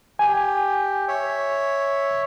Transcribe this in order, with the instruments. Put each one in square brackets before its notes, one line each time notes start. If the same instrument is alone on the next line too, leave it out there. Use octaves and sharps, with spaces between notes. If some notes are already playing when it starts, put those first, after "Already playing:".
[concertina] G4 [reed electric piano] G#5
[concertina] C#5 E5